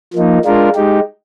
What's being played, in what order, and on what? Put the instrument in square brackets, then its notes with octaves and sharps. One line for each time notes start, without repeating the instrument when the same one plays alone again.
[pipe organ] F3 A#3 D#4
G#3 D4 F4 A#4
G#3 D#4 G4